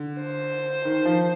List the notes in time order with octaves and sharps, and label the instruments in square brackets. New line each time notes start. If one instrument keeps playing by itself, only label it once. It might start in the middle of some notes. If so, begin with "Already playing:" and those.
Already playing: [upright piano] D3
[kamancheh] C5
[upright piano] D#3
F3